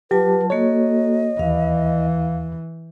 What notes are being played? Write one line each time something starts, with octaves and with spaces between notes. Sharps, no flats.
F#3 F4 G4 B4 A5
A#3 F#4 A4 C#5 D#5
D#2 E3 F5